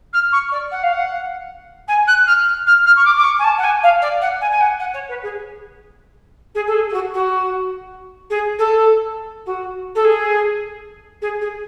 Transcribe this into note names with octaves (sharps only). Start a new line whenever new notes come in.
F6
C#6
D5
F#5
F5
F#5
G#5
F#6
F6
F6
F6
C#6
D6
D6
C#6
G#5
A5
F#5
G#5
F5
D5
F#5
G#5
G#5
F#5
F#5
C#5
B4
G#4
G#4
A4
G#4
G#4
F#4
F#4
G#4
A4
F#4
A4
G#4
G#4
G#4